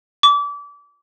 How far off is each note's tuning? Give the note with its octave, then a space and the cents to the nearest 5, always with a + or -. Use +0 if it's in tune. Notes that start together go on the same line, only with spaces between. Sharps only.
D6 -30